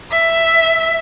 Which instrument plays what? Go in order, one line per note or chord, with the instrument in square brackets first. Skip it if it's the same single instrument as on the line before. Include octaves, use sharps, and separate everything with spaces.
[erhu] E5